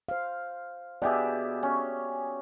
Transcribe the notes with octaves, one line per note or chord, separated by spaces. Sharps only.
C5 F5
B2 G4 G#4 D5 E5
C#4